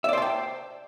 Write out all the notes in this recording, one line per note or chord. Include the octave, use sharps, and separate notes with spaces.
C5 D5 E5 G5 A5